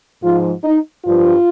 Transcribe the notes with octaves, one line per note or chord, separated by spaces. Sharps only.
G#2 F3 F4
D#4
G2 F3 F4